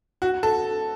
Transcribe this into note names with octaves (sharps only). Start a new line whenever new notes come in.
F#4
A4